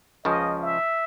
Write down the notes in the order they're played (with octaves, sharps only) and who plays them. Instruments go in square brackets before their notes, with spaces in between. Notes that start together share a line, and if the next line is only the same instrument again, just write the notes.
[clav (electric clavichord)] C#2 C#3 F3 [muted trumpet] D#5
[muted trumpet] E5